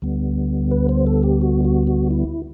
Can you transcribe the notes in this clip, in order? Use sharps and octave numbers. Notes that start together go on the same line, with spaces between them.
D2 D3 G3 B3
B4
C5
A4
G4
F#4
F#4
F#4
E4